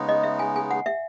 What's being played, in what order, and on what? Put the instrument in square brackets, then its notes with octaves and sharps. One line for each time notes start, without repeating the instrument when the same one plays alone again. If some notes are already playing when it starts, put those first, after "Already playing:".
Already playing: [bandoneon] C#3 G#3 B3 D#4
[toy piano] D#5
E5
G#5
G#5
F#5
E5